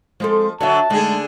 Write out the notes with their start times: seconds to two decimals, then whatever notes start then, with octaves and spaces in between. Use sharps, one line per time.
0.20 F3 G#3 C4 A4
0.61 D3 F#3 F#4 C#5 E5 A5
0.90 D3 G#3 A3 D4 D#4 G#4